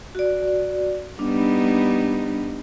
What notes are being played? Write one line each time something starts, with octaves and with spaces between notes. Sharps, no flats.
F#4 D5
G3 B3 D4 D#4